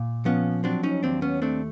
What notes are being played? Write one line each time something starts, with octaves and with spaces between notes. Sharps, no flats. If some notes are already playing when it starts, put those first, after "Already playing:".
Already playing: A#2
F3 B3 C#4
F#3 C4 D4
C#4 D#4
D#2 C4 D4
B3 C#4
A3 C4 D4